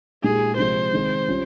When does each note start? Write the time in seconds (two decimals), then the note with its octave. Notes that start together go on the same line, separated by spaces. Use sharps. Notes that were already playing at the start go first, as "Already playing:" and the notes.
0.23 A#2 G#3 D#4 G4 G#4
0.58 C3 F3 G#3 C5
0.93 D#3 G#3 C4
1.28 G3 C#4 F4